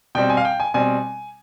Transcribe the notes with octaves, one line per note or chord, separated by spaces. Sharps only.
B2 G3 C4 G5
G#5
F5
G5
G#5
B2 G3 C4 G#5